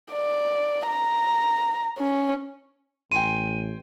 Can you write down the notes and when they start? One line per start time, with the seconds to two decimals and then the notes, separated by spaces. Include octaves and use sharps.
0.12 D5
0.87 A#5
1.99 C#4
3.11 A1 G5 G#5 C6 D#7